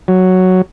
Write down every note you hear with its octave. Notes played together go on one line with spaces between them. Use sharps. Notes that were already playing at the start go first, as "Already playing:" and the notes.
F#3